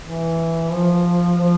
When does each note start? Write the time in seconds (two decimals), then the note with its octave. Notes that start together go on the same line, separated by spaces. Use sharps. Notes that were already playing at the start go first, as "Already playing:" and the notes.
0.02 E3
0.71 F3
1.40 F3